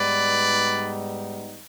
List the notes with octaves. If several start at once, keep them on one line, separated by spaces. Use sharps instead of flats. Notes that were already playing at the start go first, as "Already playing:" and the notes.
Already playing: G#2 G3 B3 D#4 B4 D5